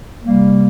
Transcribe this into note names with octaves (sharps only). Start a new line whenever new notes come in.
C3 G3 A#3